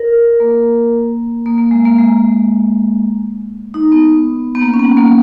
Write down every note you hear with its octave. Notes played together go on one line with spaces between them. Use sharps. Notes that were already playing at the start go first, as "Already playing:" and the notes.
Already playing: A#4
A#3
A#3
A#3
G#3
A#3
G#3
D#4
B3
B3
A#3
C#4
B3
A#3